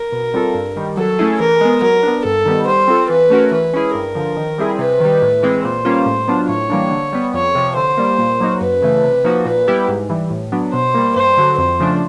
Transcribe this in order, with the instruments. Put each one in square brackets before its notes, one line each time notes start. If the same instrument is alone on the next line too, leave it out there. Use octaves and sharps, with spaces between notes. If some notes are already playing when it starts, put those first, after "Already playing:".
Already playing: [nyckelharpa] A#4
[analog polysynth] B2
G3 C4 F4 A4
G2
D#3 G3
[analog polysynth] F#3 [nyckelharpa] A4
[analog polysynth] A3 C#4 E4 G#4
[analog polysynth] E3 [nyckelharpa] A#4
[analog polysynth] G#3 B3
[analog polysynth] F#3 [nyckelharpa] A#4
[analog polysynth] B3 D4
[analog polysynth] G2 [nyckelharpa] A4
[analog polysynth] D#3 G3 B3
[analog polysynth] G3 [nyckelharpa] C5
[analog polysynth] C4 F4 A4
[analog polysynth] E3 [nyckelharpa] B4
[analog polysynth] A3 C#4 F#4 A#4
[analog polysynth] E3 [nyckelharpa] B4
[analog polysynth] G#3 C#4 E4 G#4
[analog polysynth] G2 [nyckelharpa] A#4
[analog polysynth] D3 F3
D#3
G3 C4 E4 G#4
[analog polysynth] C3 [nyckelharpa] B4
[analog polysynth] D#3 G3
A2
E3 G#3 C4
[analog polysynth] A#2 [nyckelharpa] C5
[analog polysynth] G3 A#3 C#4 F4
A2
F#3 B3 D4 F4
[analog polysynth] A2 [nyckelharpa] C#5
[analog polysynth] E3 G3 A#3 D4
D3
G3 B3
[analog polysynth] F2 [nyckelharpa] C#5
[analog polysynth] C3 F3
[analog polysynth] D3 [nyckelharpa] C5
[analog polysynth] G3 A#3
A#2
F#3 A#3 D#4 F#4
[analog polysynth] F#2 [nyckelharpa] B4
[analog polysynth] C#3 E3 A3
C3
F3 A#3 D#4 F#4
[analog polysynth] A#2 [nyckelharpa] B4
[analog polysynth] G3 B3 E4 G4
G#2
E3 G3
A2
F#3 B3 D4
[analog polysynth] B2 [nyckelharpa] C5
[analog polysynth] G3 A#3
[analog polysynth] G2 [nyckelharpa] C5
[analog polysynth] D3 F#3
[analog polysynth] F2 [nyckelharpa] C5
[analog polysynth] C#3 F3 A3 D4